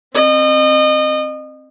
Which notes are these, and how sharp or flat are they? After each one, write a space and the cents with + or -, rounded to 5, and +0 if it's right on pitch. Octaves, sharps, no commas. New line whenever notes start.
C4 +15 D#5 -30